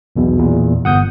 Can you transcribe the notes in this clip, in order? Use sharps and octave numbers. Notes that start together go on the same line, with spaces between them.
B1 E2 B2
E2 A#2
G1 F#5 D#6 G6